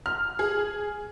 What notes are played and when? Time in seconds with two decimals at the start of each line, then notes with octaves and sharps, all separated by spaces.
0.06 F6
0.39 G#4